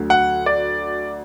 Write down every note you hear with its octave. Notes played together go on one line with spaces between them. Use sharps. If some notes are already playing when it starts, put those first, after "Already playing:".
Already playing: D2 D3 F#3
F#5
D5